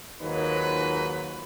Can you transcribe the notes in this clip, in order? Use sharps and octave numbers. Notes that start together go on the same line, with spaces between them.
D#2 G#2 F#3 D#4 F4 B4